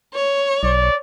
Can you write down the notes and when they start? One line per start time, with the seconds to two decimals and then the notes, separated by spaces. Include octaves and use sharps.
0.14 C#5
0.63 B1 D5